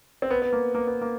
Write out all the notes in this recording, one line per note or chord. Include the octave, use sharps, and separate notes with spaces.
C4
B3
B3
A#3
A#3
B3
A#3